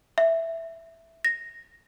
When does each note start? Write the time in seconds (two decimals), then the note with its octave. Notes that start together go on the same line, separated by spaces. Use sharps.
0.18 E5
1.25 A#6